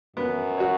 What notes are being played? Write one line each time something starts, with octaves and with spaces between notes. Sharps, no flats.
F#2 B3
F#4 C#5